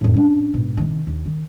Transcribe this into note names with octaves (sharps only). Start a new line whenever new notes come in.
F2 A2
C#4 D4
G#2 B2
C3 D#3
D#2
D#3